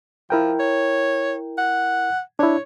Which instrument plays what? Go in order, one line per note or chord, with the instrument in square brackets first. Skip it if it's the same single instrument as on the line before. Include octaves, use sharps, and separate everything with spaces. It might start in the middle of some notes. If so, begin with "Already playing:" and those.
[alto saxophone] F3 [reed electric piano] E4 A#4 G5
[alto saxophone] C#5
F#5
[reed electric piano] D4 E4 [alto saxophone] C#5